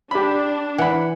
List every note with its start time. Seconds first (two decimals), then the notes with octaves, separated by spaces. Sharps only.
0.11 D4 G4 B5
0.78 E3 F#5 B5